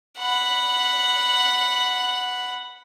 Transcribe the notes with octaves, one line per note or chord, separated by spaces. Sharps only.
F#5 B5